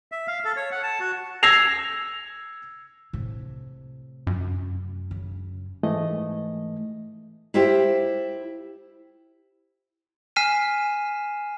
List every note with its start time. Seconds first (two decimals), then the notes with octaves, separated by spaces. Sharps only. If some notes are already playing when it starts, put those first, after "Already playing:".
0.12 E5
0.27 F5
0.45 A4
0.57 C#5
0.71 F#5
0.83 A5
1.00 F#4
1.43 E6 G#6 A#6 C7 F7
3.13 A2 C3
4.27 F#2
5.11 C#3
5.83 G#2 E3 A3 D#5
7.54 E4 F4 G4 C5 E5
10.36 G#5 F6 B6 C7 D#7 E7